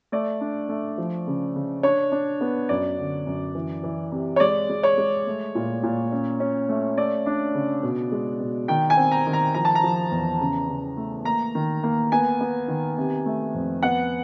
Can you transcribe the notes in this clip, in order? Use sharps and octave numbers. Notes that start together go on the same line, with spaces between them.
A3 D5
D4
A3
F3
C#3
C#3
D4 C#5
D4
B3
F#2 D5
D3
F#2
E3
E3
C3
C#5
G#3 D5
G#3
C#5
G#3
A3
A#2
A#2
C#4
C#4
A3
A3 D5
D4
C#3
B2
G#3
B2
D#3 G5
G#5
C4
A#5
D#3
A#5
F3 A#5
A5
A#5
F3
E2
C#3
C#3
A3
A#3 A#5
D#3
A#3
B3 G#5
B3
D#3
C3
A3
F2
B3 F#5